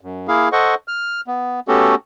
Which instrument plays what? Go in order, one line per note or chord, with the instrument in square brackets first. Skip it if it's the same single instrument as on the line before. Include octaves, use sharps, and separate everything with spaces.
[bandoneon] F#2
A#3 E4 G#4 F5
A4 C5 D#5 F#5 C#6
F6
B3
A3 B3 C#4 F#4 G4 A4